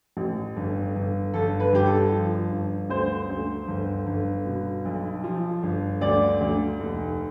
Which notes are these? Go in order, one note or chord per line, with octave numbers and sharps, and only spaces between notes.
A1
G1
G1
G1 A4
B4
G1 G4
A4
F3
G1
D2 C5
D2
G1
G1
B2
B1
F3
G1
D2 D5
D2
F1